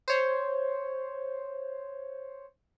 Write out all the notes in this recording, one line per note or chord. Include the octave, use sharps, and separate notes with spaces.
C5 C#5